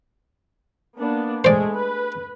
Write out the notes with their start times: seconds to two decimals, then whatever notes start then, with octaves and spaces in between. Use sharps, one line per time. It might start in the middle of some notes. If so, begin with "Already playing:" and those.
0.99 A#3 B3 D4
1.44 G#3 A3 G#4 C5 D5
1.74 B4